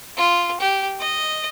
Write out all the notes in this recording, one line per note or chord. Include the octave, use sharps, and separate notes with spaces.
F4
G4
D#5